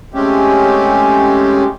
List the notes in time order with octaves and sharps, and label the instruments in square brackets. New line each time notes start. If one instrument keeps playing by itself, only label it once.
[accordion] G#3 A3 C4 C#4 G4